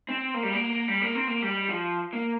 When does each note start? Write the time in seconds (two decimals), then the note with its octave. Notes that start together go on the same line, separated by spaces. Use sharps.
0.09 C4
0.34 A#3
0.43 G3
0.53 A#3
0.88 G3
1.02 A#3
1.15 C4
1.28 A#3
1.42 G3
1.69 F3
2.13 A#3